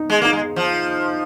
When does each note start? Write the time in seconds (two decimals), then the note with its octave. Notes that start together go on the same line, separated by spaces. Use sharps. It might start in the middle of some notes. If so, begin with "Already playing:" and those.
Already playing: D#4
0.10 G#3
0.22 A#3 D#4
0.33 G#3
0.56 F3